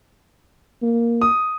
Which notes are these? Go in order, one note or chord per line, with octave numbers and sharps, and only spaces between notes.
A#3
D#6